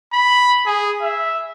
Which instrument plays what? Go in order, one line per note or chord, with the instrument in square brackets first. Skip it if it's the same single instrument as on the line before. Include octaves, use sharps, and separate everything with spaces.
[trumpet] B5
G#4
E5